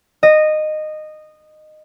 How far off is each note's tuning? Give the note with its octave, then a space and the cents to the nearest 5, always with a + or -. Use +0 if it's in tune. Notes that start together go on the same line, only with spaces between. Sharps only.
D#5 -15